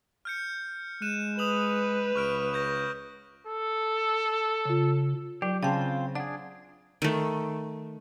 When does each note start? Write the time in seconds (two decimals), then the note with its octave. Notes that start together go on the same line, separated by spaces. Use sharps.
0.25 F6 G6 C#7
1.02 G#3 F#6 D#7 E7
1.39 B4 D#6 F7 F#7
2.15 C#2 C#6 F6 D7
2.53 C#6 G6 A#6
3.47 A4
4.65 C#3 F4
5.42 F#3 G4
5.63 C#3 C4 F4 C5 G5 A5
6.15 D4 G#4 F#5
7.02 D#3 A3